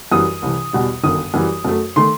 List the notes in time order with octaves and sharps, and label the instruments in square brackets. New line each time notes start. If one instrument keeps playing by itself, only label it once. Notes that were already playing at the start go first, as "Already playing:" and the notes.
[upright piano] F#2 E3 G3 D#6
C2 C3 E3
E2 B2 G3
G1 F#2 D#3 D#6
F#2 E3 G3
F#2 F#3 A3
D#3 A3 C6